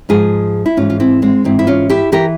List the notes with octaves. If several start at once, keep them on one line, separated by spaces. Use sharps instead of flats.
G#2 F3 F4 G#4
E4
G#2 E3 C#4 F4
F4
C4 E4
G#3 C4
G#2 E3 C4 E4
E4
C#4 F4
E4 G4
E3 G4 A#4